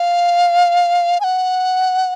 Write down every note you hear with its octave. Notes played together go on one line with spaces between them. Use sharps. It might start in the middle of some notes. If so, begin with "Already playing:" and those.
Already playing: F5
G#5
F#5